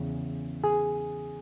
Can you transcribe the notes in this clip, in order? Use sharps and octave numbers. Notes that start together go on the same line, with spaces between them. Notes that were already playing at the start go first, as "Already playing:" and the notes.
Already playing: E2 C#3
G#4